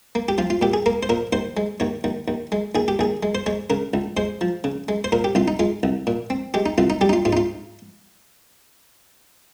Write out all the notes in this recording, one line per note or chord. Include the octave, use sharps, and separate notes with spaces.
A#3
G4
F3 F4
F4
A#2 G4
G#4
A#3 A#4
C5
A#2 A#4
D#2 C5
G#3
D#2 C#5
D#2
D#2
G#3
D#2 G#4
G4
D#2 G#4
G#3
C5
G#3 C#5
C#3 A#4
C#2
G#3 C5
F3
C#3
G#3
C5
A#2 A#4
G4
C2 F4
D#4
G#3 F4
C2
A#2
C4
G#3 G4
D#4
C2 F4
D#4
G3 G4
D#4
F4
G#2 F4
D#4
F4